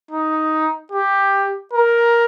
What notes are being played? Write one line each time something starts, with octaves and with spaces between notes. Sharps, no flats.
D#4
G4
A#4